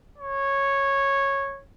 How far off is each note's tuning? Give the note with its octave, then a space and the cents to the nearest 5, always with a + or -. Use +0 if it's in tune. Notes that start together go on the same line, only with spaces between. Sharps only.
C#5 -10